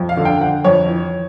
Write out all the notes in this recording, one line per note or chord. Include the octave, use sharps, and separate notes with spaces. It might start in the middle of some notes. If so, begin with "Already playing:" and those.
Already playing: F2
F5
D3
G5
D3 F#5
F2 C#5
E3